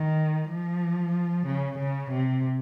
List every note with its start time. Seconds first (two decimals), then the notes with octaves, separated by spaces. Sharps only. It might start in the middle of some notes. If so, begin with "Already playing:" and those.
Already playing: D#3
0.50 F3
1.47 C#3
1.79 C#3
2.11 C3